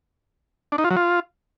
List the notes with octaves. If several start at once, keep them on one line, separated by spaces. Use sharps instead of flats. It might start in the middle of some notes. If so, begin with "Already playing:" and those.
D4
D#4
F4
F#3
F4